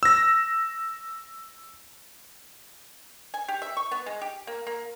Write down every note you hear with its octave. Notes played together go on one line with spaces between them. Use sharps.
E6 A#6
G#5
G4
E5
C#6
B3
G#3
G4
A#3
A#3